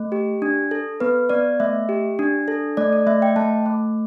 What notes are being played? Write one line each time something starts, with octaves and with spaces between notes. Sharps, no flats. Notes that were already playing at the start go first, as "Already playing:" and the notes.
Already playing: A3
G4
D4
A4
B3 B4
B3 D5
A3 E5
G4
D4
A4
A3 D5
D5
A3 E5
G5
A3 A5
A3